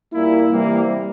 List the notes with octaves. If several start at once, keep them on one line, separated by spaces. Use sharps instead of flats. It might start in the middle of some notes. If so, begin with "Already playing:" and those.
A#2 G3 A#3 E4
C3 E3 G3 A#3